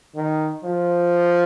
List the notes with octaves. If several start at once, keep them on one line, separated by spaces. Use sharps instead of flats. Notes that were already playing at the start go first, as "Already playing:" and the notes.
D#3
F3